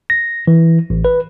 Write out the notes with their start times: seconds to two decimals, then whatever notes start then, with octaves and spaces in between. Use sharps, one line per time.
0.10 A#6
0.47 E3
0.90 A1
1.05 B4